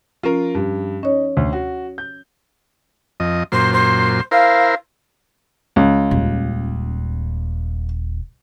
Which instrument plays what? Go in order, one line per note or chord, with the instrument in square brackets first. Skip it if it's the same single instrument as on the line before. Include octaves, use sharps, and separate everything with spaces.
[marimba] F3 C#4 [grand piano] F4 A#4
[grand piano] G2
[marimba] C#4 C#5 [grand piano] D#4
[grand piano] D2
F#4
G6
[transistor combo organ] F2 D#5
[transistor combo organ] F#2 A#2 C6 [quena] C5
[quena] C5
[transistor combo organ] E4 A#4 C5 [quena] F5
[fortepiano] C#2
[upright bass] D#1